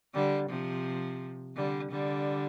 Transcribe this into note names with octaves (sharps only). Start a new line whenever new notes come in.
D3 G3
C3 F3
D3 G3
D3 G3